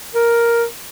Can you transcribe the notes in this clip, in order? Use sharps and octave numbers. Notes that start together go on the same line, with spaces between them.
A#4